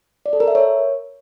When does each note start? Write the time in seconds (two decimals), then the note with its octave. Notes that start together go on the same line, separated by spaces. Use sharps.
0.26 D5
0.33 A4
0.40 A#4
0.48 E5
0.55 C#5